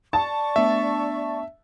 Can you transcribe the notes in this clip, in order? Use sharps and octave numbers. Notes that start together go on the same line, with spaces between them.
D5 A5 C#6
A3 B3 D4 E5